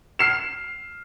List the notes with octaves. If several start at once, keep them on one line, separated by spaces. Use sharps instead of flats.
F6 C7 E7